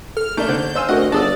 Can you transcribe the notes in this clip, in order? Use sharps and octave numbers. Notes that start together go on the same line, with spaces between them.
A4 F6
A3 A#3 D4 D#4 G6
D3 B3 C5
C5 D#5 F5 G#5 E6
D2 C4 F#4 A#4 D#5 F#5
G1 D4 D#4 G#4 D5 A5 D#6 E6